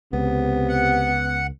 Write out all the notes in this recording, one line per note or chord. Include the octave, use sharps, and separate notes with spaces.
C#2 C3 B3
F#5